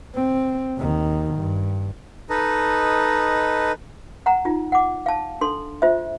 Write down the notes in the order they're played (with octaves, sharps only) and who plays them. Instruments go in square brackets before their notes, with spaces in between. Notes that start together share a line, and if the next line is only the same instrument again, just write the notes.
[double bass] C4
D#2 D#3
G2
[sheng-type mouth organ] D#4 A4 B4 D#5
[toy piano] F#5 A#5
D#4 F4
F#5 D6
F5 A5
D4 A4 C6
F4 C5 E5